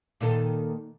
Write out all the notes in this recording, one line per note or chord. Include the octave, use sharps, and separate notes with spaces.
A#2 D#3 A4